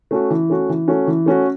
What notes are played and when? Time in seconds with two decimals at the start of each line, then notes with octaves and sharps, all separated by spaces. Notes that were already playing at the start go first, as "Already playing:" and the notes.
0.11 A3 C#4 F#4
0.30 E3
0.50 A3 C#4 F#4
0.69 E3
0.88 A3 C#4 F#4
1.07 E3
1.26 A3 C#4 F#4